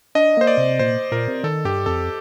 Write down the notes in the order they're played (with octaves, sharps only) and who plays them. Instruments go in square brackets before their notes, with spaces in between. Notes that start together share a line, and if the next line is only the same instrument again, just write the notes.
[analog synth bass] D4 [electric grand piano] D#5
[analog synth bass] A#3 [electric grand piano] C5
[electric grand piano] D5
[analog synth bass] C3
[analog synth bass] A#2 [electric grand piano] C5
[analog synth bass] A#2 [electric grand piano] A#4
[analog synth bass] C3
[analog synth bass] D#3 [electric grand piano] A4
[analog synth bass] G2 [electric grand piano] G4
[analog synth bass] F2 [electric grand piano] A4